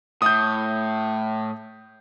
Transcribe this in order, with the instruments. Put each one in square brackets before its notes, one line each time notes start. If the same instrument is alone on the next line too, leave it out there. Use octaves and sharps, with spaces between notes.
[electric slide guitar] A2 [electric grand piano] D#6 G6